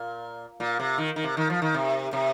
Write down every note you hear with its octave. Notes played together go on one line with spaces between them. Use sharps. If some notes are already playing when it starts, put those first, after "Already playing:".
Already playing: A#2
A#2
C3
D#3
D#3
C3
D#3
F3
D#3
C3
C3